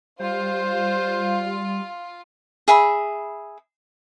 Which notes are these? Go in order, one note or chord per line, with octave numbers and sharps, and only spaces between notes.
G3 F4 C5
G#4 E5 B5